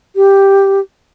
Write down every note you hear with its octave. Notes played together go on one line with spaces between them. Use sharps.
G4